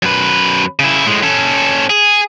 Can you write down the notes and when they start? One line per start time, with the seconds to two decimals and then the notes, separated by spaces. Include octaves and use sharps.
0.03 F#2 B4
0.79 C#3 E4
1.06 A2 G#3
1.23 C#4 A4
1.90 G#4